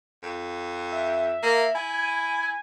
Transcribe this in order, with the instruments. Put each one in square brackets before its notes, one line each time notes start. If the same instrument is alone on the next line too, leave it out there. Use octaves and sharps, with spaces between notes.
[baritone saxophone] F2
[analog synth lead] E5
[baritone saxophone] A#3
[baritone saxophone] E4 [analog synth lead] G#5